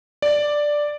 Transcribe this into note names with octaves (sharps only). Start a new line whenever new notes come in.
D5